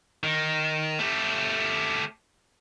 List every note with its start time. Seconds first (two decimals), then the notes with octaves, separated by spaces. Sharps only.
0.23 D#3
0.99 A3 G4